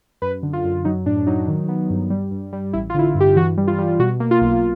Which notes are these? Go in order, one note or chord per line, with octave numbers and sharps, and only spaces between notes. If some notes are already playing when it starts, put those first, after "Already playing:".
F#2 B4
D3
F4
F#2
F#3 D#4
A2 D4
F#3 D#4
D#3
B3
G2
G3
G2
G3
A1 E4
F4
D3 E4
F4
G2
G4
E3 F#4
G3
F4
G3
B2 F#4
A#3
F4
B1